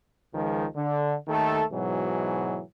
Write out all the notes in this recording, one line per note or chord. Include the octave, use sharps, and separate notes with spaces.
C#2 D#3 F3 G#3
D3
D#2 D#3 A3 A4
G#2 B2 E3 F#3